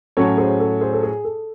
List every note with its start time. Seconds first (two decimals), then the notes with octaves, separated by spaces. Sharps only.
0.17 A2 F#3 C#4 A4 C#5
0.38 G#4 C5
0.60 A4
0.81 G#4 C5
0.93 A4
1.03 G#4
1.24 A4